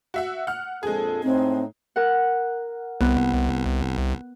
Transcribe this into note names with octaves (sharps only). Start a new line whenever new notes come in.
F#4 E5 F#5
F#5 F6
A#1 F2 G#3 G#4 A4
A2 C4 D#4
A#4 F#5
C2 B3